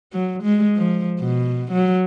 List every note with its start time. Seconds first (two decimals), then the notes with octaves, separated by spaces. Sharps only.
0.12 F#3
0.43 G#3
0.76 F3
1.20 B2
1.72 F#3